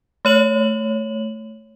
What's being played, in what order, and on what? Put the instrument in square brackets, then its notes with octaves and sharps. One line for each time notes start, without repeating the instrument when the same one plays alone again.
[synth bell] A3 C#5 F#7